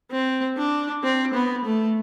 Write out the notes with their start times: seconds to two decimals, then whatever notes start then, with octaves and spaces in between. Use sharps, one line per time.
0.11 C4
0.57 D4
1.04 C4
1.34 B3
1.65 A3